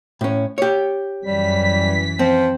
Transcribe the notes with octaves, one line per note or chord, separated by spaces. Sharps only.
A2 C#4
G4 C#5
F#2 E3 G3 B6
F3 C4